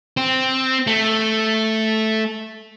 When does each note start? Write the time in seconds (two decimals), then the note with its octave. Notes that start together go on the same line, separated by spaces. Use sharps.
0.17 C4
0.87 A3